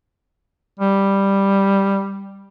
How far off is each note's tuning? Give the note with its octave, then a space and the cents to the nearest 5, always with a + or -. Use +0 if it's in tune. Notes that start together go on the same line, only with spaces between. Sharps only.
G3 +5